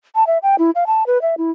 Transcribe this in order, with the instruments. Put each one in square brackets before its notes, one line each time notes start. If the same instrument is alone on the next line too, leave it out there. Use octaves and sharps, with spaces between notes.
[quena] A5
E5
G5
E4
F5
A5
B4
E5
E4